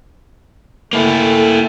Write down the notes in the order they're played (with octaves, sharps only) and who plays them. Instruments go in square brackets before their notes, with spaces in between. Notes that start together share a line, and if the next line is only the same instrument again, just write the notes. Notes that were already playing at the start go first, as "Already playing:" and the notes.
[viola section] A3 A4 [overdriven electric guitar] A#3 E4